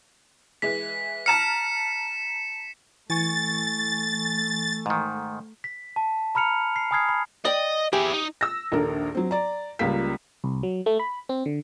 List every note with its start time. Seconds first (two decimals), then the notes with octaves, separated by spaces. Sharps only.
0.62 E3 G#3 B6
1.26 A5 A#5 F6 C#7 E7
3.10 E3 A3 G#5 C#6 A6
4.86 G#2 D#3
5.64 B6
5.96 A5
6.35 A#5 B5 F6 C#7 F7
6.76 C7
6.91 G#5 B5 D#6 F6 G#6 C7
7.09 B5
7.45 D5 D#5 G5
7.93 E4 G4 G#4
8.13 D#4
8.41 E6 A#6
8.72 A#1 D#2 D4 A4 A#4
9.15 F#3 C4
9.31 D5 A#5
9.79 C#2 G3 A#3 F4 B6
10.44 C2
10.63 F#3
10.86 A3
11.00 B5
11.29 C4
11.46 D3